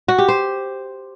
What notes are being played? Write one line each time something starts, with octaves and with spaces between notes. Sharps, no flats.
F#4
G4
C5